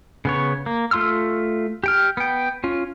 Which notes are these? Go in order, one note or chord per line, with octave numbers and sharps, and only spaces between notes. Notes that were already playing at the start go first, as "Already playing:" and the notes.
C#3 B3 C#5
A#3
A3 F4 C6 E6 F6
G4 G5 F6
B3 G5
C#4 F4